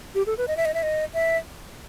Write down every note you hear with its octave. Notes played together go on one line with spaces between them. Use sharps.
G4
A4
B4
D#5
E5
D#5
E5
D#5
E5